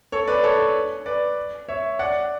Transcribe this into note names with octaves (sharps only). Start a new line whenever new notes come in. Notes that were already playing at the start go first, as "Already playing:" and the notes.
A4 C#5
B4 D5
A4 C#5
B4 D5
C#5 E5
D5 F#5